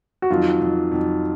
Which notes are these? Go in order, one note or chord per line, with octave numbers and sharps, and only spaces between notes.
F#4
F2 D#3 F#3 F4
F2 D#3 F#3
F2 D#3 F#3